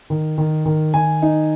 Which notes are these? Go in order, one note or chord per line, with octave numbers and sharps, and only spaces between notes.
D#3
D#3
D#3
D#3 G#5
D#4